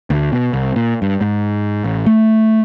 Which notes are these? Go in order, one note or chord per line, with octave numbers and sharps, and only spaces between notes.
D2
B2
C2
A#2
G2
G#2
A1
A3